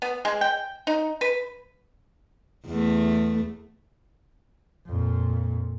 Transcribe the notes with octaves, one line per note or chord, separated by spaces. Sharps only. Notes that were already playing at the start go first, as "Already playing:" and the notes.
B3
G#3
G5
D#4
B4
E2 A3
F2 A#2